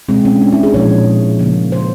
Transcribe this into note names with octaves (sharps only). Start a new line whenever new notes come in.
B2 G#3 C4
C#4
D4
E4
G#4
A#2 F3 G#3 C#5
C#3 F3 A#3
C5